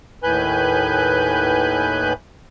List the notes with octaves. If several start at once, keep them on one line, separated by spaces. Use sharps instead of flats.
D#2 A2 B4 G#5 F#6 G6